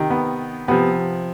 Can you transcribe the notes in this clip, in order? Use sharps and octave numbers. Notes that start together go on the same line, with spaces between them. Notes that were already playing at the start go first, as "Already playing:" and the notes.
Already playing: C3 D#3
B3
C3 F3 B3